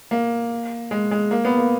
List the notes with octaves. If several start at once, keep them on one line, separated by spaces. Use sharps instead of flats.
A#3
G#3
G#3
A#3
B3
A#3